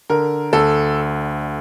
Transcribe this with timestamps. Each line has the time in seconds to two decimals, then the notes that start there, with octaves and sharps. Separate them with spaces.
0.10 D3 A#4
0.53 D2 A4